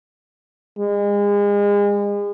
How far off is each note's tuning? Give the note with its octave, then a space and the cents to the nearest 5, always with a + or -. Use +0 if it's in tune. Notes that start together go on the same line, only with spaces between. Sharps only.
G#3 -35